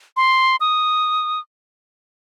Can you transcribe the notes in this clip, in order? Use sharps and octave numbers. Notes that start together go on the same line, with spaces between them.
C6
D#6